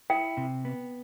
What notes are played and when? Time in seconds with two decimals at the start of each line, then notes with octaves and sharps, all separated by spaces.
0.10 E4 G5
0.37 C3
0.65 B3